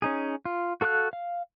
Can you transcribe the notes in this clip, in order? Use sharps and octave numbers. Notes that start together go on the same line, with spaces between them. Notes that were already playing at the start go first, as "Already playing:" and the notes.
C#4 D#4 G#4
F4
F#4 A4 F5 C#6 F#6
F5